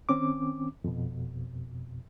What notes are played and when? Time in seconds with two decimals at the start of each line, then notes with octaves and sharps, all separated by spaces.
0.09 D#3 C4 C#4 D6
0.84 F2 B2